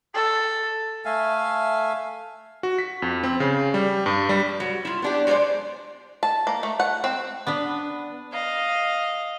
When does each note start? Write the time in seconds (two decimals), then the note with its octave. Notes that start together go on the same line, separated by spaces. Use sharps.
0.15 A4
1.05 A3 E5 F5 G#5
2.63 F#4
2.78 B6
3.02 F2
3.23 C4
3.40 C#3
3.74 G3
4.06 G2
4.29 G3
4.60 F#3
4.85 E4 F4
5.02 B3 D4 G4
5.27 F#3 G#3 A#4 C5 D5
6.23 A5
6.47 A#3
6.63 A3
6.80 F#5
7.04 C4
7.47 B3 D4 B4
8.32 D#5 F5